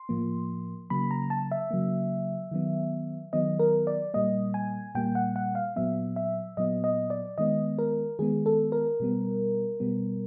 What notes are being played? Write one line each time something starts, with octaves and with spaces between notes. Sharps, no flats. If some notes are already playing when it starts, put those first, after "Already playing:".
Already playing: C6
A2 F3 A#3
C#3 F#3 A#3 B5
A#5
A5
E5
C#3 F#3 A#3
D#3 F#3 B3
D#3 F#3 B3 D#5
A#4
D5
A#2 G3 A#3 D#5
G#5
A#2 G3 A#3 G5
F#5
F#5
F5
A#2 F#3 B3 E5
E5
A#2 F#3 B3 D#5
D#5
D5
D#3 G#3 B3 D#5
A#4
D#3 G#3 B3 G#4
A4
A#4
B2 G3 B3
B2 G3 B3